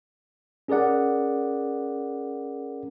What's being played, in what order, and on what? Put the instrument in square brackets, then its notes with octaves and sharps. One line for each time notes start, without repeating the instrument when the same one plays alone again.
[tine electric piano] C#4 G#4 A#4 D5 F#5